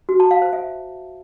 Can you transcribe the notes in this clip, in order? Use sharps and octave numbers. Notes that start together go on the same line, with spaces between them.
F#4
A5
F5
C5
E5